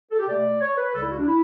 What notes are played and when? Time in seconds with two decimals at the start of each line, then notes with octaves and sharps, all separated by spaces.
0.11 A4
0.19 G4
0.27 B2 A3 D5
0.60 C#5
0.77 B4
0.94 C#2 C#3 G3 A4
1.02 E4
1.10 F#4
1.19 D4
1.27 E4